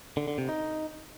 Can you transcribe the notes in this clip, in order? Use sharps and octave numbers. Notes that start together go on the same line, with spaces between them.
D3
D3
C3
D#4